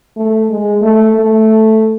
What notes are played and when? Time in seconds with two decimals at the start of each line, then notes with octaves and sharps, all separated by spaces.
0.17 A3
0.50 G#3
0.82 A3
1.15 A3